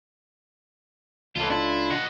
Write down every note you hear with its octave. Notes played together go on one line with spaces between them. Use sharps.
C#2 E3 F4 A4
D4 E4 F4
D#5 F#5